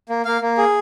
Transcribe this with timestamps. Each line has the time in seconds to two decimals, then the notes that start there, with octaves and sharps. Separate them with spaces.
0.09 A#3
0.25 A#3 F5
0.41 A#3
0.58 G#4